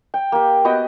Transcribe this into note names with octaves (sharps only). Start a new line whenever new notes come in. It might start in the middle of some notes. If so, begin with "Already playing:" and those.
G5
A#3 G4
B3 F#4 D#5 G5